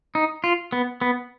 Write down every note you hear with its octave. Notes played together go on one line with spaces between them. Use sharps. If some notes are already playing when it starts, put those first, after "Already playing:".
D#4
F4
B3
B3